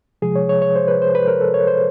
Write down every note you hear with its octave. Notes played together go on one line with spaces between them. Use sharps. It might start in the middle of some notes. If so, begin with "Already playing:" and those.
C3 F3 G#3 G#4
C#5
C#5
C#5
C5
B4
C5
B4
A#4
A4
C#5
C5